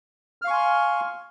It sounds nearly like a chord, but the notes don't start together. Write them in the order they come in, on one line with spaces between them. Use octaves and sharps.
F6 F5 C#6 G#5 C6